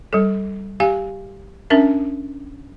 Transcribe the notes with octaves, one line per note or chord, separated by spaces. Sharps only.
G3 A4
G4 F5 G#5
C#4 D4 A#4 E5